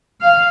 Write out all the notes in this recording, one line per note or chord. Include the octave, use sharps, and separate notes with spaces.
F5